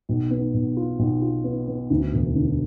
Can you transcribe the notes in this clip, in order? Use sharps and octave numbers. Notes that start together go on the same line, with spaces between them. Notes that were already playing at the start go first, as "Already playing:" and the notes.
B1
B3
B1
F4
B1
F4
B3
B3
D2
E1
D3